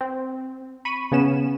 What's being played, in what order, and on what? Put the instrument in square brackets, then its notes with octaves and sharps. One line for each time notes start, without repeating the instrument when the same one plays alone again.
[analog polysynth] C4
B5 C#6 D#7
C#3 B3 C#4 E7